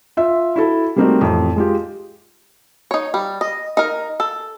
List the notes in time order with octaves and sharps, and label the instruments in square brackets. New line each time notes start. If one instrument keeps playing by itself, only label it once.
[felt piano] F4 E5
E4 F#4 A4
G3 A3 A#3 C4 D#4 F#4
A1 F2
G#3 F4 G4
[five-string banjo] D#4 C#5
G3
D#5
D#4 A#4
A4